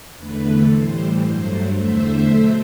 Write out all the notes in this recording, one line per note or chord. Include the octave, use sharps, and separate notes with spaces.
E2 D3 A3 B4
A2 E3 G3 C5
G2 F#3 A3 C5
E2 D3 A3 C5 E5
B2 F#3 A3